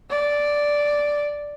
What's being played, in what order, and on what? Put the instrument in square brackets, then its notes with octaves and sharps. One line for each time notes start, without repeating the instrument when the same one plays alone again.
[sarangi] D5